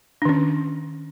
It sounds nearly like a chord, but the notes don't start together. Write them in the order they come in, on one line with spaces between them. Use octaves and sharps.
D4 D#3 C#4